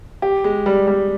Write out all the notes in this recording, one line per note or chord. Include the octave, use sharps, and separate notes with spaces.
G4
G#3
G3
G3